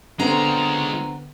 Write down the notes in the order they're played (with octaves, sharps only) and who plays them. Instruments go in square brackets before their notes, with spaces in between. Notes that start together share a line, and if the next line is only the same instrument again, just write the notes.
[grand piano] D3 B3 C4 [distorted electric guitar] G#3 F4 [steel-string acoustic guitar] A#5